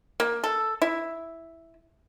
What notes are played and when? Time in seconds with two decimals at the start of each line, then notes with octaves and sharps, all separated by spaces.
0.20 A#3
0.44 A4
0.82 E4